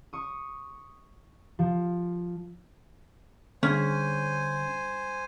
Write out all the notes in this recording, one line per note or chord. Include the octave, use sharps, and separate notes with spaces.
C#6 D#6
F3
D3 G3 C#4 D4 G#4 C5 G#5